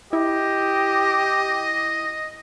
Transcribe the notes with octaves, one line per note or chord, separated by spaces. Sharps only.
E4 G4 D#5